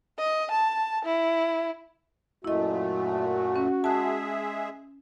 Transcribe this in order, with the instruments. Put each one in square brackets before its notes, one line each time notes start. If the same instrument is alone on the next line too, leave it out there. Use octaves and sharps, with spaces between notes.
[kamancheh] D#5
A5
E4
[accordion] F#2 A#2 A3 [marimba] E4 D#5 [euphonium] F#4
[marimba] C#4
[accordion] G#3 G#4 E5 [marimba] A5 F#6